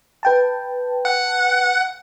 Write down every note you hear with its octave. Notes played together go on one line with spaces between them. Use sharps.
B4 G5 A5
F#5